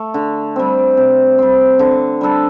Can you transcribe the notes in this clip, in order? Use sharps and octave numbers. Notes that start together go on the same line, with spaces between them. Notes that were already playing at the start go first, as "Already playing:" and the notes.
Already playing: A3
D3
G3 C4
C3
G3 C4
D3
G3 D4 A4